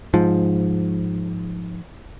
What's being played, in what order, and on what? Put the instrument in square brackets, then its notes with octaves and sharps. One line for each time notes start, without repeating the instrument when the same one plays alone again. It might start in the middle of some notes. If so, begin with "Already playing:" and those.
[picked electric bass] G#2 F3